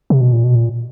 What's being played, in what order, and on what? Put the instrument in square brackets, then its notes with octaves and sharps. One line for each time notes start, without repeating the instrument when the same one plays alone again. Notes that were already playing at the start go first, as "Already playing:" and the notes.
[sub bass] C3
B2
A#2
B2
A#2